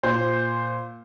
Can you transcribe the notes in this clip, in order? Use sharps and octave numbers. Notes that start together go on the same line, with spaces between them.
A#2 C5